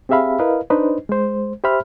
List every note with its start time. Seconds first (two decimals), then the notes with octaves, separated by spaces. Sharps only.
0.09 C4 G4 G#4 E5 F5 B5
0.39 E4 A#4 B4 D#5 F5
0.70 D4 D#4 B4 C5 D#5
1.09 G#3 C5
1.64 G4 C5 E5 B5 F6